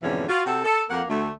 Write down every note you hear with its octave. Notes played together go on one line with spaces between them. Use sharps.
F2 G#2 B2 D3 E3 C#4
F4 F#4
C3 F#4 G4 A4
A4
F2 A#3 F#5
D2 A3